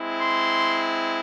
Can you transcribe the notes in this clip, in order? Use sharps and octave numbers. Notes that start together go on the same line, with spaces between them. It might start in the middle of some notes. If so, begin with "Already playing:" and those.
Already playing: G#3 C4 E4
C6